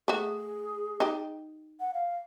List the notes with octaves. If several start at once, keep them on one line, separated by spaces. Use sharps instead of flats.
A3 F#4 G#4
D#4 G4
F#5
F5